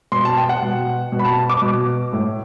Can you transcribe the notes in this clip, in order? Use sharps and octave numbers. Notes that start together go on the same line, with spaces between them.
B2 C6
A5
G5
F#5
B2
B2
B5
A5
D6
B2
A2